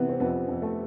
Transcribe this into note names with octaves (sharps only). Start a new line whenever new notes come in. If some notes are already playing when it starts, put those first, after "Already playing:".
Already playing: C3 E3 B3
C4
F2 B3
F2
A3